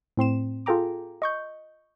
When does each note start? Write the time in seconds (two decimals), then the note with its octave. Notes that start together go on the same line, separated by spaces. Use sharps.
0.17 A2 C4 C6 E7
0.66 F4 G#4 A4 G5 A#5 D6
1.22 D#5 C#6 G6